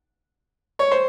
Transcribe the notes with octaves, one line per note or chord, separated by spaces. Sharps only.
C#5
C5